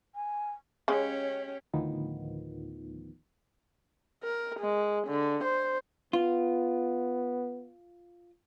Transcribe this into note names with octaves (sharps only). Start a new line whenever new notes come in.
G#5
C#3 G#3 C#4 G4 C#5
D2 A2 D#3 F3 B3
A#4
G#3
D3
C5
B3 F4